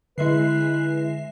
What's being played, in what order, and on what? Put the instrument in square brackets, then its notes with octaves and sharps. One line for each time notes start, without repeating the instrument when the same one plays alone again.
[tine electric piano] D3 E4 [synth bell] G#3 E5 C7 [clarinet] B4